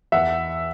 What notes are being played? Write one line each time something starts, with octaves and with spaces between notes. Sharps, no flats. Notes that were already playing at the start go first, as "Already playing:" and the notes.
E2 E5 F#5